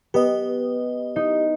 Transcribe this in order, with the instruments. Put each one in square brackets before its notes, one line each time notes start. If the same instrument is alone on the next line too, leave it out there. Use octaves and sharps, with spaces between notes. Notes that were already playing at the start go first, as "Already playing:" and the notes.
[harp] B3 [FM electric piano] G4 D#5
[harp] D#4